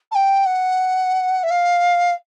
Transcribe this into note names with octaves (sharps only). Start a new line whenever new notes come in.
A5
G5
F#5
E5
F5